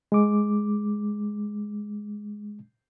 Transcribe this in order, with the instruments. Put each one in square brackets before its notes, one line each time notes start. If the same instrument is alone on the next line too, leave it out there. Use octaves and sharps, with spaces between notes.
[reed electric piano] G#3 D6